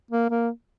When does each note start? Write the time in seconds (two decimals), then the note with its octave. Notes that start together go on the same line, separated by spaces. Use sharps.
0.11 A#3
0.30 A#3